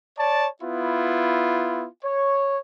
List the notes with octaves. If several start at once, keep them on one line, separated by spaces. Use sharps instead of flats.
C#5 D5 A5
B3 E4 F4
C#5